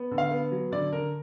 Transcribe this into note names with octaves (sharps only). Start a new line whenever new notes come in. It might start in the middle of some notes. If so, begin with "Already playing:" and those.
Already playing: B3
D3
F5
B3
F#3
D3 D5
D3 A#4